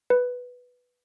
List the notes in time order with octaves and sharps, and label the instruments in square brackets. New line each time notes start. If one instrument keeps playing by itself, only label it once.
[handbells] B4